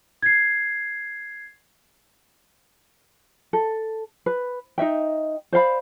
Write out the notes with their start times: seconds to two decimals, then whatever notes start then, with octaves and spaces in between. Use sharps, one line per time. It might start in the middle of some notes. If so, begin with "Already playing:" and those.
0.22 G#6 C7
3.53 A4
4.26 B4
4.78 D#4 D#5 E5 G5
5.52 C5 D5 F5 B5